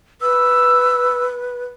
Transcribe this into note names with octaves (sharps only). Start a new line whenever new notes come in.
B4 E6